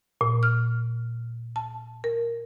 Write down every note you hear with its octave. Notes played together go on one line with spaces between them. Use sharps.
A#2
F6
A5
A#4